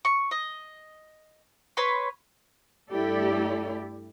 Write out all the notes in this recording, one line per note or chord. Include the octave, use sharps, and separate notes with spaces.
C#6
D#5
B4 C#5 C6
G2 A3 E4 G4 A4 D5